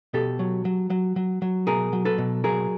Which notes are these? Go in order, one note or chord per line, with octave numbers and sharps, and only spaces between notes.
B2 G4 A4
F#3
F#3
F#3
F#3
F#3
B2 G#4 A#4
F#3
A4 B4
B2
F#3 G#4 A#4